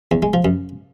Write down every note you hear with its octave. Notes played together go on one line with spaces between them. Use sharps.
E2
G#3
F3
F#2